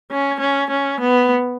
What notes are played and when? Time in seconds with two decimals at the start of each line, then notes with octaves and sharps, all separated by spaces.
0.11 C#4
0.40 C#4
0.70 C#4
1.00 B3